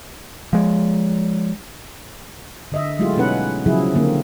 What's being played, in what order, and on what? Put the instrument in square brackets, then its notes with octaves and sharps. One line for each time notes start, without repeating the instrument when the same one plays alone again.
[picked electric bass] F3 G#3
[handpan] D3 D#5 E5
F#3 G#3 A3 E4 F4 G4
B2 B3 C#4 D#4 B4 F#5
C#3 F3 F#3 E4 G#4
D3 A#3 C4